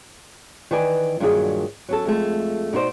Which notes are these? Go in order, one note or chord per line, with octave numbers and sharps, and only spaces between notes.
D#3 E3 B4 D5 G#5
G2 A#2 D#3 F#3 F4 G#4
F#3 C#4 A4
F2 G#3 A3
B2 D#4 F4 C5 D5